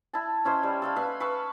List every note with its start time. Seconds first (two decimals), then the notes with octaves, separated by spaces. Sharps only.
0.13 E4 A5
0.45 C#4 E4 C5 D#5
0.63 G3
0.82 A4 F5 B5
0.96 B4 E5 F5
1.20 B4 C#6 E6